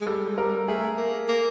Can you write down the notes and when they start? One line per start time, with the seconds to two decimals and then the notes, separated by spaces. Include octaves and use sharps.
0.01 G#3
0.06 G3 A4
0.28 G#3
0.37 G3 A#4
0.68 A3 G#4
0.98 A#3
1.28 A#3